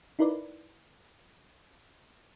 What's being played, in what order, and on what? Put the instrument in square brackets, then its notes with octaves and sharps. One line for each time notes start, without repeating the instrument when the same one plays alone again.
[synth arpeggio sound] D#4 E4 A#4 B4 D5